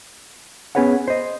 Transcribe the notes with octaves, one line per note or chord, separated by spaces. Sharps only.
B3 C#4 G#4 B4 C#5 F#5
C5 D#5